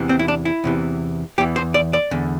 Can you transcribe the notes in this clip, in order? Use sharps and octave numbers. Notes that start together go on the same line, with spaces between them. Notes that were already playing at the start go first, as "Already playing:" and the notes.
Already playing: E2 C3 E3
C4
E4
D4
E4
E2 C3 E3
E2 E3 G4
C5
D5
D5
E2 D3